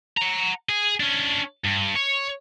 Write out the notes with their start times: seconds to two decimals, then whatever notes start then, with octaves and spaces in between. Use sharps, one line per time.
0.17 F#5 A#5
0.69 G#4
1.00 C#4 D4
1.65 G2
1.96 C#5